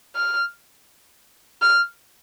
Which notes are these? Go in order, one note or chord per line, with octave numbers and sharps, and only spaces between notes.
F6
F6